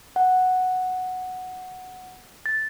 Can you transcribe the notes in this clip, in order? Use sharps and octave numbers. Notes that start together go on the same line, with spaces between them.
F#5
A6